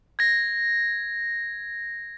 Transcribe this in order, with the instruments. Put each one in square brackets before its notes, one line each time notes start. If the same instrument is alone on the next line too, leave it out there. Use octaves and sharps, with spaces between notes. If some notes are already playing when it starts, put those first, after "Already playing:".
[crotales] G#6 A#6